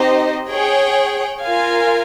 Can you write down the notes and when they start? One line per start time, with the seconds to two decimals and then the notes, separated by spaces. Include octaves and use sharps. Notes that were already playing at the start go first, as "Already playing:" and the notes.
Already playing: C4 D#4 G4 C5 D#5
0.49 G#4 C#5 G5
1.42 F4 A#4 F5 G#5